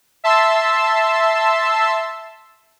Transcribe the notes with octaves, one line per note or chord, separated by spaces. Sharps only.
E5 A5 C6 E6